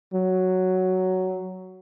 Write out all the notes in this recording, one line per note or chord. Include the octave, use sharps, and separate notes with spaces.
F#3